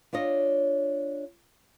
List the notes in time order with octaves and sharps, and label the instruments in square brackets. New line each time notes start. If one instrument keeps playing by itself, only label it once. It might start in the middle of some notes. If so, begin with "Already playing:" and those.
[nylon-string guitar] D4 F4 C#5 D#5